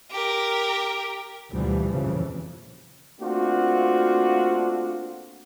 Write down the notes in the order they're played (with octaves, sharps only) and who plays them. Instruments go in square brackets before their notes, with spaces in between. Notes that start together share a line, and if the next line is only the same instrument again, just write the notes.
[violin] G4 A#4
[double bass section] D2 B2 E3 F3 G3
F2 A#2 C#3 E3 F3 G3
[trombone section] A3 A#3 C4 D4 F4 F#4